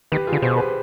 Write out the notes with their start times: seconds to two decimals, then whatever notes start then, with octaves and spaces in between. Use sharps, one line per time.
0.12 D#3 G4 B4
0.27 F4 G#4
0.33 D3
0.42 B2 G#4 C5
0.57 G4 B4